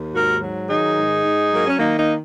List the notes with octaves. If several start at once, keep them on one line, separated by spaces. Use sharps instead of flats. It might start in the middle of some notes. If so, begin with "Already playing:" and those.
Already playing: D#2
G#2 F#4 A#4
F#3
D#3 D#4 G#4
G#2
G#2
F#3
A#3
C#4
D#3 A#3 D#4
A#3 D#4